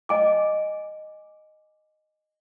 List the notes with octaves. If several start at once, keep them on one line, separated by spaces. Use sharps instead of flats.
D#5 G#5 D6